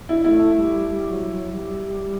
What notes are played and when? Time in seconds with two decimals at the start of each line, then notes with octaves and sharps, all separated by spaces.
0.09 E4
0.24 A3 E4
0.56 G3
0.87 G3
1.08 F#3
1.29 F#3
1.50 G3